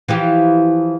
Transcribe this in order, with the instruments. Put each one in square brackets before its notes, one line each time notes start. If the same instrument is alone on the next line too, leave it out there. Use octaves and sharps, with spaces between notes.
[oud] E3 F3 G4